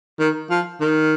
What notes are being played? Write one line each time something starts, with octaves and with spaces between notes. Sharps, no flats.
D#3
F3
D#3